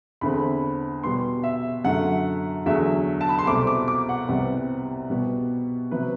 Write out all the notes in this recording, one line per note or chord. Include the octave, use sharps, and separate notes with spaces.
E2 D3 A3 C4 B5
B2 G3 B3 C6
E5
F#2 D3 A3 F#5
E2 D3 F#3 A3 E5
A5
B5
C6
C2 B2 A3 C4 D6
D6
D6
F#5
C2 C3 G3 B3
B2 G3 B3
C3 F#3 B4